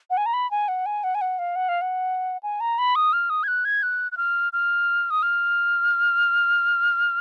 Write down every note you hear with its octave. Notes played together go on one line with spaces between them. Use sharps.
F#5
G#5
A#5
B5
G#5
F#5
G#5
F#5
G#5
F#5
F5
F#5
F5
F#5
G#5
A#5
B5
D#6
F6
D#6
G#6
F#6
G#6
F#6
F#6
F6
F6
D#6
F6